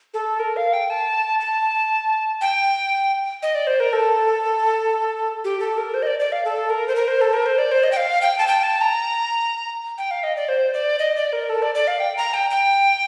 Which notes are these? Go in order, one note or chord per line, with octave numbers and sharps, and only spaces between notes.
A4
A#4
F5
G5
A5
A5
G5
D#5
D5
C5
A#4
A4
G4
A4
A#4
C5
D#5
D5
D5
F5
A4
A#4
C5
A#4
C5
A4
A#4
C5
D5
C5
D#5
G5
F5
G5
A5
G5
A5
A#5
G5
F5
D#5
D5
C5
D5
D#5
D5
A#4
A4
D5
D5
F5
G5
A#5
G5
G5